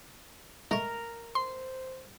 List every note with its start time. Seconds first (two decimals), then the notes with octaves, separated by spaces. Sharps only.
0.71 G#3 A3 A#4 C#6
1.35 C5 C6